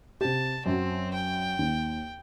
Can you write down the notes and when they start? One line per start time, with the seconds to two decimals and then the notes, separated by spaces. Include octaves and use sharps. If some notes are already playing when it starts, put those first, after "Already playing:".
0.21 C3 G4 A5
0.66 F#2 F#3 C4
1.13 G5
1.59 D#2